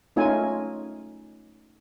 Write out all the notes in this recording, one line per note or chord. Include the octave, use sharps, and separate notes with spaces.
A3 C#4 D#4 F4 G#5